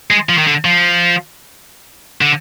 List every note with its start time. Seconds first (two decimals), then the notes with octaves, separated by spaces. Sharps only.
0.11 G#3
0.29 F3
0.38 D#3
0.47 D3
0.65 F3
2.21 D3